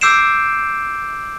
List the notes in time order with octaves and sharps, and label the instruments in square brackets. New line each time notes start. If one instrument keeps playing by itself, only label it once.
[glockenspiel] D6 E6 G6 C7 D7 E7